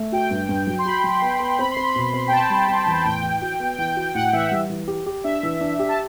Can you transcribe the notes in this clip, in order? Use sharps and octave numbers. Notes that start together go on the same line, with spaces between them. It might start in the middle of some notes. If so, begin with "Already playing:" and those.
Already playing: A3
F#4 G5
G2
G2
F#3
C6
F#4 B5
F#3
B3
B3
C4 B5
C6
C4
B5
B2
C4
G5
C4 A5
G3
C4
E2
A2 G5
E3
F#4
B3
E3 G5
F#4 G5
A2 F#5
E3 E5
G3
E3
G4
G4
D4 E5
E3
D4
G4
A5